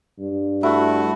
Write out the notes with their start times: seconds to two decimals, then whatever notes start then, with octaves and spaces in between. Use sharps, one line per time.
0.19 G2
0.63 A3 E4 F#4